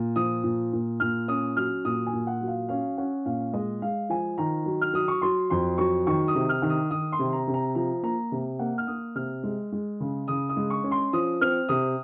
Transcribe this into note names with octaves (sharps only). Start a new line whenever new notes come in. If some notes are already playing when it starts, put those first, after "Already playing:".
Already playing: A#2
F3 D#6
A#2
A#2
A#2 F6
C#4 D#6
F#3 F6
A#2 D#6
G#5
A#2
F#5
F#3
F5
C#4 F5
C#4 F#5
A#2 F5
G#3 D#5
G#3 F5
F3 G#5
D#3 A#5
F#3
F6
F#3 D#6
C#6
F#3 C6
F2 C6
F#3 C#6
D#3 C#6
D#6
C3
F6
D#3
D#6
D#3 D#6
C6
C3
A#5
C3
A#5
F3 A#5
A#3 A#5
C3
A#3 F#5
F6
A#3 D#6
C3 F6
G#3
G#3
C#3
C#3 D#6
D#6
G#3
C#6
C#4
C6
F3 D#6
C4 F6
C3 D#6